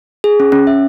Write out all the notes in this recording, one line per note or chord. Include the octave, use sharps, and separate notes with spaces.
G#4
C#4
C#4
E5